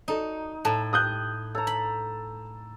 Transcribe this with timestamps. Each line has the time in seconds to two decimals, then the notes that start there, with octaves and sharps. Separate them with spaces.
0.08 D#4 F#4 A4 D5
0.65 A2 A4 A5 A#5
0.93 G4 D#6 F#6 G6
1.55 A4 C#5 A#5
1.67 B5